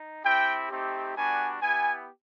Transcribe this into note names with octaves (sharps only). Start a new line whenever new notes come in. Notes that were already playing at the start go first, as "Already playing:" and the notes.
Already playing: D#4
C4 E4 G4 G5
A3 C4 D#4 G4
G3 B3 D4 F#4 G#5
B3 E4 G4 G#5